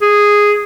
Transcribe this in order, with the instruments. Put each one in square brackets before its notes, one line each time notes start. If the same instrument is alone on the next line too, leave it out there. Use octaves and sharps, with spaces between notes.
[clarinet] G#4